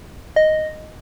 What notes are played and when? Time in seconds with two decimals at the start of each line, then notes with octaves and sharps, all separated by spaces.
0.36 D#5